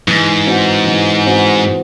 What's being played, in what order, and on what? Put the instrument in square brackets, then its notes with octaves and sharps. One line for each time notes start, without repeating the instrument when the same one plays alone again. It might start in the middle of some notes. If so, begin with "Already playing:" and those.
[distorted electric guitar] G#2 [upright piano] E3
[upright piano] C4 F#4 C5
E3
C4 F#4 C5